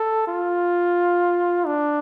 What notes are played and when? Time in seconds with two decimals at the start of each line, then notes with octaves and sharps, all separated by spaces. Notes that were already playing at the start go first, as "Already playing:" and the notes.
Already playing: A4
0.27 F4
1.66 D4